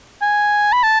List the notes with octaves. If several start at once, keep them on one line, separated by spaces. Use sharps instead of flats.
G#5
B5
A5